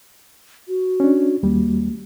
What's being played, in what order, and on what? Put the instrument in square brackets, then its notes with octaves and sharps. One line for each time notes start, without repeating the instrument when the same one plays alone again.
[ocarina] F#4
[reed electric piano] C#4 D4
[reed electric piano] D#2 G3 [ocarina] A#3